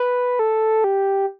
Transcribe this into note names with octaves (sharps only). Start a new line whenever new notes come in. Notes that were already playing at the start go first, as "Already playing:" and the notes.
Already playing: B4
A4
G4